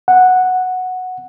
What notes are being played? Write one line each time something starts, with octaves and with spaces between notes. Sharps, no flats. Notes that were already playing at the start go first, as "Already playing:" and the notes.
F#5